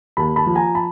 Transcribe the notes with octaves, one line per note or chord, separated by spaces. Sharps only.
D#2 A5 B5
A5 B5
F3
G#5 A#5
A5 B5